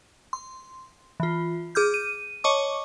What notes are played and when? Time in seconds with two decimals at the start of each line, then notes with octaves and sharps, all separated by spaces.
0.33 C6
1.20 E3 F4
1.75 G#4 D6 F6 G6
1.94 D#7
2.44 C#5 D#5 A5 C#6 D6